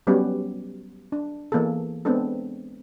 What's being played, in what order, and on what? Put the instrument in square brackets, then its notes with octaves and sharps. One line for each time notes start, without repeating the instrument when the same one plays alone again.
[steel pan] F#3 G3 B3 C#4 F#4 G4
D4
E3 A#3 B3 G#4 A4
G#3 B3 C4 D4 A4